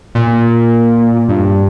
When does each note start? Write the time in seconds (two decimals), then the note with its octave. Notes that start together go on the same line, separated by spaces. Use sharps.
0.15 A#2
1.29 G2